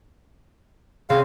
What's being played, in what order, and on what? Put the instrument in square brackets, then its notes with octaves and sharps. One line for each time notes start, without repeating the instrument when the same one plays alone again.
[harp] C3 C4 C#4 [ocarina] G#4 [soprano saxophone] F5